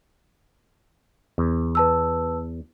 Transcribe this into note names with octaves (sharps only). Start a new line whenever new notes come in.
E2
B4 A5 E6